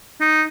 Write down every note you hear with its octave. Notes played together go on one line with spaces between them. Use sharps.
D#4